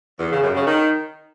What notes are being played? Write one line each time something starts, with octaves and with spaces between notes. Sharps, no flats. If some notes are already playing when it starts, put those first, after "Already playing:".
E2
C#3
F#2
C#3
D#3